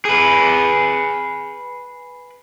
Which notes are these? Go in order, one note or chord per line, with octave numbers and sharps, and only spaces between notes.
G#4 B4